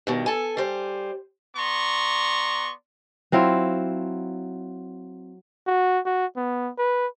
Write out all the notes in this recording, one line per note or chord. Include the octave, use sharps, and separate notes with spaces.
G2 B2 D#3
A4 G#5
G3 C5
B3 D5 A#5 C6 C#6
F#3 C4 E4 F4
F#4
F#4
B3
B4